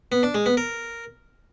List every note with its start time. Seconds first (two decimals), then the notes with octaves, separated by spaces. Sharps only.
0.12 B3
0.23 D4
0.35 G#3
0.46 B3
0.57 A#4